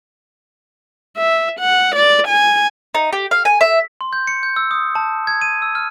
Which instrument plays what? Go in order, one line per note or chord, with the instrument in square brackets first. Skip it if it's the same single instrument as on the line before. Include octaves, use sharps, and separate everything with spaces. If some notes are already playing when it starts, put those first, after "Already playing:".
[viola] E5
F#5
D5
G#5
[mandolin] D#4
G4
F5
G#5
E5
[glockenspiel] C6
G6
C#7
G6
E6
D#6
A5
G#6
D#7
E6
F6